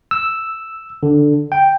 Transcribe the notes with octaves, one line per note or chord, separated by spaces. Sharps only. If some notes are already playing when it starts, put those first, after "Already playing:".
E6
D3
G5